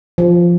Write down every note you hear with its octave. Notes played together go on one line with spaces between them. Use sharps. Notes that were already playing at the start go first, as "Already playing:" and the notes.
F3